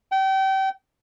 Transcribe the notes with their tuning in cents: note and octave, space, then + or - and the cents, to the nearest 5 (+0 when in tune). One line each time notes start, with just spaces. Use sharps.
G5 -30